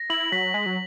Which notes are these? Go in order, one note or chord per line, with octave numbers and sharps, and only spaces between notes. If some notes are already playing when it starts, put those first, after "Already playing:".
Already playing: A#6
E4 F#7
F#3 B6
G#3 B6
F#3